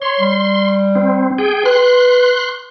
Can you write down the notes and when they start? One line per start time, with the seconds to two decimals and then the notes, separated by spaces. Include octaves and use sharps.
0.02 C#5 C6
0.20 G3
0.95 C4
1.38 G#4 G5
1.65 B4 C6 F#6